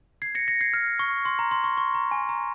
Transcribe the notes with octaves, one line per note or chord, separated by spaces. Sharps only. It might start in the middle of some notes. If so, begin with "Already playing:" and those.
G#6 C7
A#6 C#7
A#6 C#7
G#6 C7
F6
C#6
C6
A#5
C6
C#6
C#6
A#5
G#5
A#5